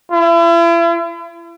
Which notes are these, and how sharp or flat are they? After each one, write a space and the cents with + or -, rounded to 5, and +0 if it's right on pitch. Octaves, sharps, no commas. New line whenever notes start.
E4 +40